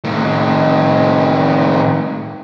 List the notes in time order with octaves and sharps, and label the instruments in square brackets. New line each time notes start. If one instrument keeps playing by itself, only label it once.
[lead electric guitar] A2 D#3